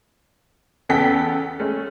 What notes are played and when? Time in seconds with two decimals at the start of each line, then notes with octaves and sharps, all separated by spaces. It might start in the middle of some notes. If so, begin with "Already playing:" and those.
0.89 E2 C#3 B3 A4 G5 B6
1.59 G#3 A3 C#4